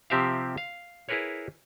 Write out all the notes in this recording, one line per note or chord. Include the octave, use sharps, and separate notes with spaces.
C3 F3 C4 G4 E5 F5
F5
E4 G#4 A#4 B4 C#5